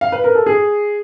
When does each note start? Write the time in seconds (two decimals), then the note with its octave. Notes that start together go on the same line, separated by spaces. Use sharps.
0.01 F5
0.12 B4
0.24 A#4
0.35 A4
0.46 G#4